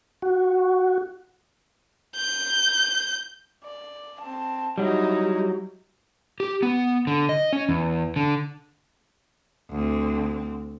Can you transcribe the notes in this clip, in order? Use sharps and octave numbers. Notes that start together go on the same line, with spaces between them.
F#4
G6
D5
C4 A5
F#3 G3 D#4 E4
G4
B3
D3
D#5
C#4
E2
D3
D2 C4